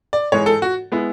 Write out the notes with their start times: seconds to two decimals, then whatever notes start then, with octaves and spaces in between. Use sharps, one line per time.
0.13 D5
0.32 G#2 E3 G#3 C#5
0.46 A4
0.62 F#4
0.92 G#3 B3 E4